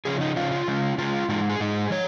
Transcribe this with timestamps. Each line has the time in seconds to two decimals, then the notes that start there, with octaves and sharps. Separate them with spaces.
0.05 C#3 F3 C#4 G#4
0.21 D#4
0.36 C#3 F3 C#4 F4
0.52 F4
0.68 C#3 G#3 C#4
0.98 C#3 G#3 C#4 F4
1.29 G#2 G#3 D#4 F4
1.50 G#4
1.60 G#2 G#3 D#4
1.90 F3 C#5